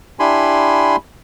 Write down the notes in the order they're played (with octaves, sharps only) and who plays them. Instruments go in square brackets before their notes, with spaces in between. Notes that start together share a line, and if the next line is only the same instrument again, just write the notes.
[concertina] D4 E4 G4 G#5 B5 C6